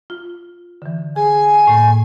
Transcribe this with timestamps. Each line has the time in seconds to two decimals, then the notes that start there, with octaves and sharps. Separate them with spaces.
0.10 F4
0.82 D3 E3
1.16 G#4 G#5
1.67 A2 A#3